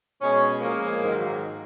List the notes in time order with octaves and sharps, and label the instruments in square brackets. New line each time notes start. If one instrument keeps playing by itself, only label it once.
[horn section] B2 G#3 C#4
A#2 F3 G#3 A#3
G#2 D#3 F#3